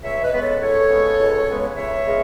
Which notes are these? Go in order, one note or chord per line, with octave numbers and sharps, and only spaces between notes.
C#2 C#5 E5
B4 D#5
C#3 G#3 B3 B4
A4 C#5
C#2 A4 C#5
C#3 G#3 B3
C#2
C#3 G#3 B3
C#2 C#5 E5
C#3 G#3 B3